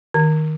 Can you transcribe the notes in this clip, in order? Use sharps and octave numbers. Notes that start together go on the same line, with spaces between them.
D#3